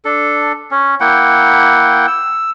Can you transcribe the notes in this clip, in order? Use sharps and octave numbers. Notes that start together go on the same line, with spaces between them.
D4 A4
C#4
A#3 E4 F#5 G5
E6